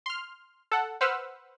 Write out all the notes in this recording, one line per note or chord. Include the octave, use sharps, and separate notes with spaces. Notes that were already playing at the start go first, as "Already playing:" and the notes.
C6 F6
A4 F#5
B4 C5 F#5 E6 F6